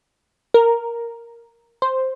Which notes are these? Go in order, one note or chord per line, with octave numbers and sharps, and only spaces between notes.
A#4
C5